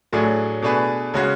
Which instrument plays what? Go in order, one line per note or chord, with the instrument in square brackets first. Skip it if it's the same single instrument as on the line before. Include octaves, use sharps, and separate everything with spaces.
[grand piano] A2 F#3 A3 D4 G#4
B2 A3 D4 G#4 B4
C#3 G#3 C#4 F#4